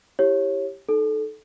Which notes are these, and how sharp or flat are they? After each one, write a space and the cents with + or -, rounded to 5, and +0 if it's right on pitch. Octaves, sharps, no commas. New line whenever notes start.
E4 +0 G4 +0 C#5 -15
D#4 +0 A4 -15